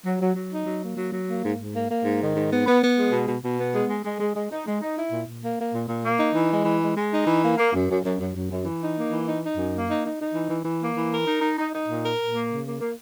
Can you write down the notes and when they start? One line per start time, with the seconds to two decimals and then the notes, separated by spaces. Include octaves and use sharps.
0.05 F#3
0.20 F#3
0.35 F#3
0.51 D#4
0.66 F#3
0.82 A#3
0.97 F#3
1.12 F#3
1.27 A#3
1.43 G#2
1.58 G#2
1.74 A#3
1.89 A#3
2.04 G#2
2.20 D#3
2.35 G#2
2.50 B3
2.66 B3
2.82 B3
2.97 G#3
3.12 B2
3.28 B2
3.43 B2
3.58 B3
3.74 G#3
3.89 G#3
4.05 G#3
4.19 G#3
4.35 G#3
4.50 D#4
4.66 G#3
4.81 D#4
4.97 E4
5.12 A#2
5.27 A#2
5.42 A#3
5.58 A#3
5.73 A#2
5.89 A#2
6.04 A#3
6.20 D#4
6.35 E3
6.50 G#3
6.65 E3
6.81 G#3
6.97 G#3
7.12 D#4
7.27 E3
7.42 A#3
7.58 A#3
7.73 F#2
7.88 F#2
8.04 F#2
8.19 F#2
8.34 F#2
8.50 F#2
8.65 E3
8.81 D#4
8.96 A#3
9.11 E3
9.27 D#4
9.42 D#4
9.57 F#2
9.73 A#3
9.88 D#4
10.04 D#4
10.19 D#4
10.35 E3
10.50 E3
10.65 E3
10.80 A#3
10.96 E3
11.11 A#4
11.27 D#4
11.42 D#4
11.57 D#4
11.73 D#4
11.88 A#2
12.03 A#4
12.19 A#2
12.34 A#3
12.50 C#3
12.65 A#3
12.80 A#3